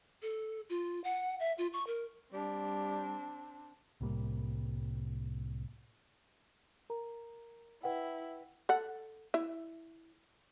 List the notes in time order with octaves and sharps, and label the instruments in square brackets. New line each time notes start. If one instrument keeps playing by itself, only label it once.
[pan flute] A4
F4
F#5
E5
F4
C#6
A#4
[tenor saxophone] G3 [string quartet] C4 D4
[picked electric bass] C2 A2 G3 A#3
[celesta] A#4 A#5
[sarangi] E4 [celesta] B4 F#5 G5
[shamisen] A4 F#5
E4 E5